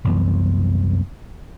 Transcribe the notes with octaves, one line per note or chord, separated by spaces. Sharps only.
C2 F#2 E3 B3